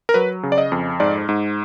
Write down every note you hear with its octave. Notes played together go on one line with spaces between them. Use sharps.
A#4
F#3 B4
C#3
D5
D#5
F2
G#2 D5
G#2